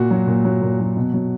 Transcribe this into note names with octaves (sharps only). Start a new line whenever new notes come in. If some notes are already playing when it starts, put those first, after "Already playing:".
Already playing: A#2 F#4
F#3
A#2
F#3
A#2
F#3
B2
F#3